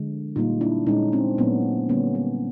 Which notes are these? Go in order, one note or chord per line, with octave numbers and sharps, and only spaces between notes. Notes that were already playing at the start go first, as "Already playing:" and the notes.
Already playing: D3 F3 G#3
A#2 G3 A#3 D#4 F4
D4 E4
A#2 F3 G#3 C#4 D#4
C4 D4
A#2 F#3 A#3 B3 C#4
D3 G3 A#3 B3 C#4
B3